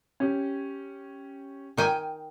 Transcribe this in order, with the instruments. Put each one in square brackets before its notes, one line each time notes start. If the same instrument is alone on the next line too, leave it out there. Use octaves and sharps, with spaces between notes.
[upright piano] C#4 G4
[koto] D#3 G5 G#5